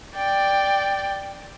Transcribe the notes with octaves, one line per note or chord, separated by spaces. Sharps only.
D5 G5